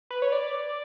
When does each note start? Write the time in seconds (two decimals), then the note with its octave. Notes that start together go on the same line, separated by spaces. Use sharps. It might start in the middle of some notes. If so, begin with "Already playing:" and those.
0.10 B4
0.22 C#5
0.32 D5